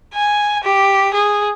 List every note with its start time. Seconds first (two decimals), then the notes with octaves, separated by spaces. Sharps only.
0.14 G#5
0.63 G4
1.14 G#4